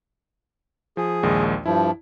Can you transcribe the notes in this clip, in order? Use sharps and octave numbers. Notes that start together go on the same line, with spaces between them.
F3 G#4
A#1 D#2 G#3
G2 F3 E4